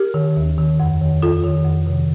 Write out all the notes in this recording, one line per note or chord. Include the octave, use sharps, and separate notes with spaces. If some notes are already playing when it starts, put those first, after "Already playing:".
Already playing: G4 A#4
D#3
D#2
D#3
F2
D#3
F2 F4 A4
D#3
F2
C3 D#3